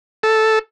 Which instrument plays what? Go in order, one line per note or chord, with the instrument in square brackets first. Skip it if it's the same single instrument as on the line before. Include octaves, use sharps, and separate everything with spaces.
[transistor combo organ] A4